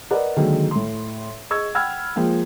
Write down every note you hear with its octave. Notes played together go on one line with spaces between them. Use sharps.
A#4 B4 D5 D#5 F#5
D3 D#3 F#3 G#3 A#3
A2 C6
G#4 D#5 C#6 E6 G#6
F#5 G5 B5 E6 F6 G#6
F3 G#3 A#3 G5